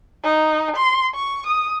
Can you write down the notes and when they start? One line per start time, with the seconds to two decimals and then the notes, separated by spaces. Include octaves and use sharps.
0.24 D#4
0.76 C6
1.14 C#6
1.47 D#6